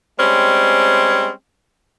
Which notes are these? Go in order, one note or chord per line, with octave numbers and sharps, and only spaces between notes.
G3 G#3 C4 C#4